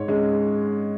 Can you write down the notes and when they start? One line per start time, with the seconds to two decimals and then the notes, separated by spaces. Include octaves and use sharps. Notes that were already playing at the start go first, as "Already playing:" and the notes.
Already playing: G#2 C#5
0.08 G#3 C#4